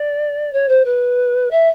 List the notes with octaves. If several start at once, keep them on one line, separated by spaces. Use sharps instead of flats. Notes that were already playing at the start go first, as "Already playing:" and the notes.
Already playing: D5
C#5
C5
B4
E5